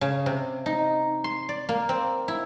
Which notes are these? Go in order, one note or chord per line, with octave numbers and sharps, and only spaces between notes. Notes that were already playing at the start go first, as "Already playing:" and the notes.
C#3
C3
D#4
C6
D5
A#3
C4
E4